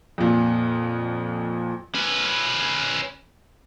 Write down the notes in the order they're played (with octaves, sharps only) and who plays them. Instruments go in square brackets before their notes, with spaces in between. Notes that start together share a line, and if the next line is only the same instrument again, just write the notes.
[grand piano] F2 A#2
[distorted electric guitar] C#4 B4